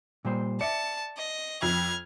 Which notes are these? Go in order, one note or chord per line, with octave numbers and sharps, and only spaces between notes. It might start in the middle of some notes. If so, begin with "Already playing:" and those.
A#2 G3 C5
D5 E5 A5 C#7
D#5
F2 F6 G#6